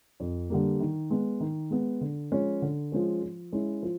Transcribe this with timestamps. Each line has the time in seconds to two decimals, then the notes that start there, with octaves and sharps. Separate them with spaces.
0.20 F2
0.50 D3 G3 A#3
0.80 D#3
1.10 G#3 B3
1.40 D#3
1.71 G#3 B3
2.01 D3
2.32 F3 G#3 C#4
2.62 D3
2.92 F3 G#3 C#4
3.22 F3
3.53 G#3 C#4 E4
3.83 F3